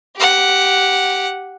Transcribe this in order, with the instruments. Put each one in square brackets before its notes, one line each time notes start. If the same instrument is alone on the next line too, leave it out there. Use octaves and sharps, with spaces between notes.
[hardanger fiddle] G4 F#5